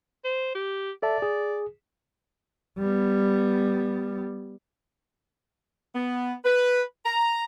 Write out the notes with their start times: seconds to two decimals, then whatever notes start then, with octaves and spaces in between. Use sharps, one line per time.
0.24 C5
0.55 G4
1.03 A4 D5 E5 A5
1.22 G#4
2.79 G3 B3
5.95 B3
6.45 B4
7.05 A#5